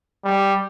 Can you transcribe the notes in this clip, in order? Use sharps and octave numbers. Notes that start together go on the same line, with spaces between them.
G3